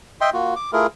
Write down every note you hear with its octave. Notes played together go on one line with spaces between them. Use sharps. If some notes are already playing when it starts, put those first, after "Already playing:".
D#5 E5 G5 C6
A#3 F4 F#4
D6
A3 E4 F4 G#4 A#4